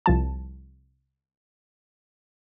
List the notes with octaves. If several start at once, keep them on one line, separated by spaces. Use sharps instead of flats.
C2 F3 A5